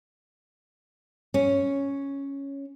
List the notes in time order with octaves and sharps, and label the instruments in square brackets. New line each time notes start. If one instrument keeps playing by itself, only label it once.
[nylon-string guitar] C#4